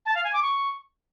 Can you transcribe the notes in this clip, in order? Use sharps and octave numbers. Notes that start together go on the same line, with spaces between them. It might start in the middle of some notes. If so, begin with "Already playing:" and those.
A5
F5
G#5
D6
C#6